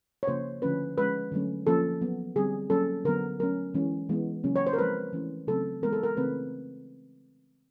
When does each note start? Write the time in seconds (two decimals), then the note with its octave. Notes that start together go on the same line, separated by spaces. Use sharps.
0.23 C#5
0.28 C#3 F3 A#3 C5
0.62 D3 F3 A3 C#4 B4
0.98 F3 G#3 C#4 B4
1.32 D3 F#3 A3 C#4
1.67 F3 A#3 C#4 A4
2.01 F#3 B3
2.36 D3 G3 C4 G#4
2.70 F#3 A#3 C#4 A4
3.05 D3 F#3 B3 A#4
3.40 F#3 A3 C#4 A#4
3.74 E3 G#3 C#4
4.09 E3 G#3 B3
4.44 C#3 F#3 A#3 C#4
4.56 C#5
4.67 C5
4.73 A#4
4.78 F3 G#3 C4 B4
5.13 E3 A3 C#4
5.47 C#3 F#3 A3 C4 A4
5.82 E3 G#3 B3 A#4
5.93 A4
6.03 A#4
6.17 C#3 E3 A3 C4 B4